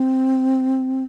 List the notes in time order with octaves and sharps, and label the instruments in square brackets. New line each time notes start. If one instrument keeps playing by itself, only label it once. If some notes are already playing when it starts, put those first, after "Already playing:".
Already playing: [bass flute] C4